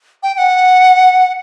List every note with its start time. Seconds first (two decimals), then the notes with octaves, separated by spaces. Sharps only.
0.23 G5
0.34 G5
0.38 F#5